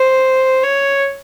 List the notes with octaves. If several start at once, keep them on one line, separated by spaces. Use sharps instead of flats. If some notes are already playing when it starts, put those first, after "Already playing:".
Already playing: C5
C#5